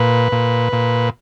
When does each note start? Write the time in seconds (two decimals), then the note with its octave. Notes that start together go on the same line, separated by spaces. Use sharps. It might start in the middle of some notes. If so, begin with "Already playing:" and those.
Already playing: A#2 B4
0.32 A#2
0.73 A#2